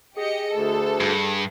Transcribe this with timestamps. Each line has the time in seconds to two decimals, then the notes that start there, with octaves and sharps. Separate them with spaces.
0.17 G4 G#4 D#5 C#7
0.52 D2 A4
1.00 G2